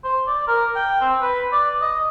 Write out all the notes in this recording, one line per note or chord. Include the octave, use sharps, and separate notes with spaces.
C5
D5
A#4
G5
C4
B4
D5
D#5